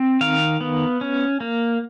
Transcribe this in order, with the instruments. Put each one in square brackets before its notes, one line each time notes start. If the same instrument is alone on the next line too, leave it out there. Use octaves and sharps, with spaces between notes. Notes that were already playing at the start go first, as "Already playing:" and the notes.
Already playing: [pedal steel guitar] C4
D#3 F5
B3
C#4
A#3